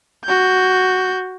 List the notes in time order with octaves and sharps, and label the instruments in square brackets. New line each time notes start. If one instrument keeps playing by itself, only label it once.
[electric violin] F#4 G6